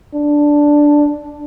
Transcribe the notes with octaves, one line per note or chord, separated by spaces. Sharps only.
D4